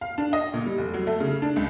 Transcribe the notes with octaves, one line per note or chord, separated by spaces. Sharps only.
F5
D4
D#5
A#2
G3
F1
F#3
A3
C#3
D4
C#2